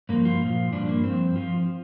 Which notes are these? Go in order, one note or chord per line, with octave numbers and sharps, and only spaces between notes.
G2 F3 A#3
F4
A#2 F3
G2 F3 D4
A#3
G2 F3 C4
F3 F4